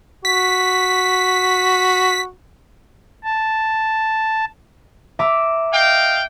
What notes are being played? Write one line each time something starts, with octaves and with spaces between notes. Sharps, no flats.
F#4 B6
A5
E5 A#5 D6
D#5 F5 G5